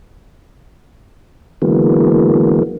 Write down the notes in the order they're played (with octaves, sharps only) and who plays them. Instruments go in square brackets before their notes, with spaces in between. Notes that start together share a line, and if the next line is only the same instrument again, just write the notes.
[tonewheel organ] D3 E3 F#3 G#3 A#3 B3